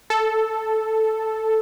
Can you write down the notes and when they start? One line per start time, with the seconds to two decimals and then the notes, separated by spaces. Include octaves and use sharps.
0.10 A4